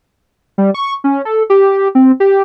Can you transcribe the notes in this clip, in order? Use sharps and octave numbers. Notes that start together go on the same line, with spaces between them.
G3
C#6
C#4
A4
G4
C4
G4